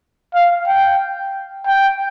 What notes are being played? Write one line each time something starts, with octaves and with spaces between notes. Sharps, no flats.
F5
G5
G5